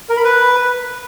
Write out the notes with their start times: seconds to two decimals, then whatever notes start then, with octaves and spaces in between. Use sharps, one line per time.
0.09 A#4
0.17 B5
0.24 B4